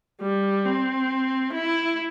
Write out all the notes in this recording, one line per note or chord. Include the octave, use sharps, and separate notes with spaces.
G3
C4
E4